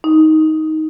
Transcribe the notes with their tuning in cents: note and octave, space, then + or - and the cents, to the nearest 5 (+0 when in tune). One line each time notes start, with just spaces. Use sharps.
D#4 +10